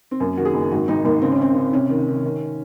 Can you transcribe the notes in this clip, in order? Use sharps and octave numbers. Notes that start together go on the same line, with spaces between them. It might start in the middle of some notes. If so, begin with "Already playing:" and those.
C4
F#2 A#3
D#3 F#4
G#4
F#1
G#1 F#4
G#1 D#4
G#1 A#3
C#3 C4
C#4
C#3 C4
C#3
C3 C#4
D#3
D#3
D#3